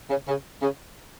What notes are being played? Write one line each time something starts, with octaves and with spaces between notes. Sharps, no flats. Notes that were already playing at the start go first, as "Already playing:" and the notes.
C#3
C#3
C#3